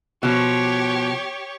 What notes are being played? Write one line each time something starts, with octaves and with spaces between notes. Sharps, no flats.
B2 F3 G4 C#5